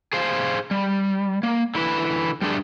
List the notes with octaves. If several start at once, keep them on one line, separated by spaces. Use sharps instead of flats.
G#4 C5 F5
G3
A#3
D3 E4 B4
G3 A3 D4 G#4